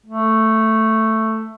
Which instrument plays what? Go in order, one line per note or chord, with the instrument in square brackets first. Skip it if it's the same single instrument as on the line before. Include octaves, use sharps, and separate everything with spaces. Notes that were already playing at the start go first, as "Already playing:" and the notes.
[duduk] A3